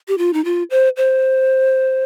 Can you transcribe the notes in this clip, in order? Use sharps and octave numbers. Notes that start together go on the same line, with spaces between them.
G4
F4
D#4
F4
C5
C5